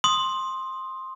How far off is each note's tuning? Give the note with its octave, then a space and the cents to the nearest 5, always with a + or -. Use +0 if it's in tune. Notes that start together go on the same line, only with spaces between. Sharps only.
C6 +10 D#6 +0